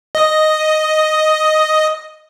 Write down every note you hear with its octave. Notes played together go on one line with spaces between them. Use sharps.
D#5 D#6